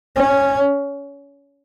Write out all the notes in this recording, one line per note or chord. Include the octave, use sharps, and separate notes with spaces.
C#4